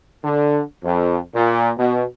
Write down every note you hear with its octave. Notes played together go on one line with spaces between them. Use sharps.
D3
F2
A#2
B2